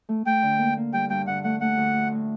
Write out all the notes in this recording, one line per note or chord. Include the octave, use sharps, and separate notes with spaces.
A3
A3 G5
D3
A#3
A#3
G3 G5
G2 G5
D3 F#5
A3 F#5
A3 F#5
D2
A2
A2